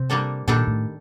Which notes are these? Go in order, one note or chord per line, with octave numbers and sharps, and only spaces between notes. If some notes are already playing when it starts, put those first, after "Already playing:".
Already playing: C3 C4
G3 A#3 D4 A4
A#2 D#3 G3 D4 A4
A2